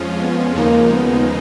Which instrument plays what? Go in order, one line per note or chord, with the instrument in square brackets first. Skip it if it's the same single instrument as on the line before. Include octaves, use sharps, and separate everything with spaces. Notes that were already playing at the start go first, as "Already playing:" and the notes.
Already playing: [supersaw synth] F2 F3 G#3 C#4 F4
[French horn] B3
[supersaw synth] D#2 C#3 F3 G#3 D#4 [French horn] A#3
[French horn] B3